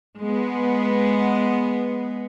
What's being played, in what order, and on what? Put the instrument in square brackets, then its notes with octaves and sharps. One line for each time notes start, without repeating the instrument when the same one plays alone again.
[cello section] G#3 B3